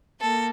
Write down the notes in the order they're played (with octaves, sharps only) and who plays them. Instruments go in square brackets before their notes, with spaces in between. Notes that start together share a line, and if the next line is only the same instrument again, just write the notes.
[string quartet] A#3 A4